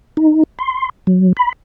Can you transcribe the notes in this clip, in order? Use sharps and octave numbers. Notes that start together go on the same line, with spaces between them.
D#4
C6
F#3
B5